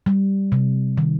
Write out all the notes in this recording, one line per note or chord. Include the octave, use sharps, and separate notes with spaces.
G3
C3
D#3